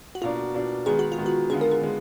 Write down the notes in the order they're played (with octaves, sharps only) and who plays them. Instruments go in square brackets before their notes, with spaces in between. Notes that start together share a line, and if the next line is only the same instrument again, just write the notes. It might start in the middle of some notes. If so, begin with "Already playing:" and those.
[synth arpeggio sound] F#4
[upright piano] B2 A#3 D4 [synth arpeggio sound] F4
[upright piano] B2 A#3 D4
[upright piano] D#3 G#3 B3 [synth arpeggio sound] G#4
[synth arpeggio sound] F#4
F4
[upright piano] D#3 G#3 B3
[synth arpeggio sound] F#4
[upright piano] D3 G#3 B3 F4 [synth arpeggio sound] G#4
[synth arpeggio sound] A#4
G#4
[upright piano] D3 G#3 B3